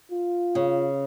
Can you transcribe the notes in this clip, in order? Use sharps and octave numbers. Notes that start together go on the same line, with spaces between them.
F4
C#3